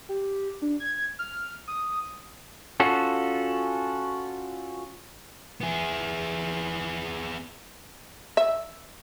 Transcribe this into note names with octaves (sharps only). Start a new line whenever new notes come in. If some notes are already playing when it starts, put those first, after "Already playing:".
G4
D4
G#6
F6
D#6
C#4 F4 F#4 A4
B3 G#4
E5